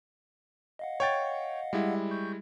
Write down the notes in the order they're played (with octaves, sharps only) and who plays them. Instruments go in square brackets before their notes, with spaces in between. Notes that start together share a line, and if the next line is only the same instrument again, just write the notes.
[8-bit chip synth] D#5 F5 F#5
[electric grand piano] C#5 G5 A6
G3 G#3 E4
[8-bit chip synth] C#6 G6